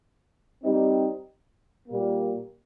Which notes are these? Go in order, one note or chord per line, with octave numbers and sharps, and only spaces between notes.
G3 C4 D#4
A#2 G3 A#3